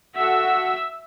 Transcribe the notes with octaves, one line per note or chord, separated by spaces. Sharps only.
F#4 A4 E5 F#5 E6